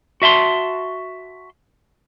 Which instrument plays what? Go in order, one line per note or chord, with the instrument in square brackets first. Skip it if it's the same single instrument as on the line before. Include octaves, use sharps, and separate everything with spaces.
[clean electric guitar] F#4 E5 A5 C6